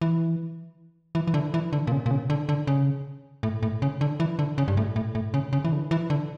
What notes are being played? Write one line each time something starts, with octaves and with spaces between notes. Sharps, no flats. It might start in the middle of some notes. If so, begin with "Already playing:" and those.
E3
E3
E3
D3
E3
D3
A#2
C#3
A#2
C#3
D3
D3
C#3
A2
A2
C#3
D3
E3
D3
C#3
G2
A2
A2
A2
C#3
C#3
E3
D3
E3
D3